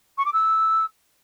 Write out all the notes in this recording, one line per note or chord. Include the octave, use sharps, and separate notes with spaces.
C#6
D6
E6